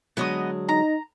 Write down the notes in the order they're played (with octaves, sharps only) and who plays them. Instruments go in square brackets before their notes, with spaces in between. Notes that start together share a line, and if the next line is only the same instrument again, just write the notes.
[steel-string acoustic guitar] D3 F#3 G#3 [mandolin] B3 D#5 D#6
[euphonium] D#4 [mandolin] A#5